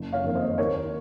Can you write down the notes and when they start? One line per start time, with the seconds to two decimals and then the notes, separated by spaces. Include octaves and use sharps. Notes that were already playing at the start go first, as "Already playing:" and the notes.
Already playing: F#1
0.13 C#5 F5
0.24 F2 D#3 A#3
0.35 C5 D#5
0.58 D#2 A#4 C#5